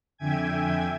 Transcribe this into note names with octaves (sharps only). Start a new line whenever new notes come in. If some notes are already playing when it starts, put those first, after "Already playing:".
F2 D3 E5 G5 G#5 G#6